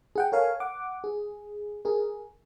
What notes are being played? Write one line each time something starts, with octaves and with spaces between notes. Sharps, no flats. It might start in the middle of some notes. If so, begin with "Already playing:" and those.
G#4 F#5 G5
A4 A#4 C#5 F5 G#5
F#5 D6
G#4
G#4 A#4